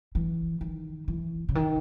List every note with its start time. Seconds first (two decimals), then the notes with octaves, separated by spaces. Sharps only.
0.15 E3
0.61 D#3
1.08 E3
1.49 C#3
1.55 D#3